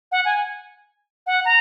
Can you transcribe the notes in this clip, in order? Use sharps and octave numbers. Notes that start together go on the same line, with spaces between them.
F#5
G#5
F#5
A#5